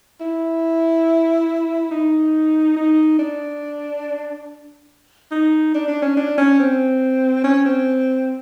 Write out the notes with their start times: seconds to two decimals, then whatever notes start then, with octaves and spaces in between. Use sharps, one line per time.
0.21 E4
1.91 D#4
2.76 D#4
3.19 D4
5.32 D#4
5.74 D4
5.88 D4
6.02 C#4
6.17 D4
6.38 C#4
6.59 C4
7.44 C#4
7.65 C4